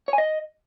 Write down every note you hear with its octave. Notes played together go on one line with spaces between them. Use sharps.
C#5
G#5
D#5